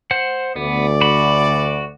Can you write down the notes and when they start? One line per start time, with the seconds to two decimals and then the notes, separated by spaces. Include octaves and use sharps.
0.11 C5 F#5
0.56 D2 B3 D5
1.01 F#4 B5